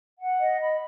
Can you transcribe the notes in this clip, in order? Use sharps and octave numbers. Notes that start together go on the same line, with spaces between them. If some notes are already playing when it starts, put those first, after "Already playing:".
F#5
D#5
B5